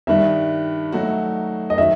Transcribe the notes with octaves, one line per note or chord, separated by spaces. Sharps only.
G2 D#3 G3 E5
F#3 A3 D#4 F#4
D#5
D#3 F#3 E5